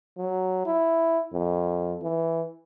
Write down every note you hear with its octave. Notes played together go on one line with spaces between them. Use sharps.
F#3
E4
F2
E3